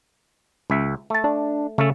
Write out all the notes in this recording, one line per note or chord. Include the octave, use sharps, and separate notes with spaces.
C#2 E5
A3 A5
D4
C#3 A3 C#4 A4